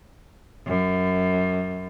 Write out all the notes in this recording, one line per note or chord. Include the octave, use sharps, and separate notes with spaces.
F#2